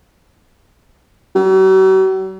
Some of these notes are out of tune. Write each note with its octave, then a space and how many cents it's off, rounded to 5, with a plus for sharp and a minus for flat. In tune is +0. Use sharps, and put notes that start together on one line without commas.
F#3 +45